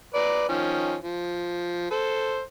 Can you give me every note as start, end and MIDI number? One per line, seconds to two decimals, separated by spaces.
0.15 0.44 71
0.15 0.44 74
0.15 0.44 82
0.49 0.95 51
0.49 0.95 53
0.49 0.95 61
1.01 1.86 53
1.91 2.40 69
1.91 2.40 72